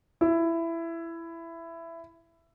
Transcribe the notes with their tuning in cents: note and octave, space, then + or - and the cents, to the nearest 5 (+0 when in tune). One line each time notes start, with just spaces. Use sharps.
E4 +15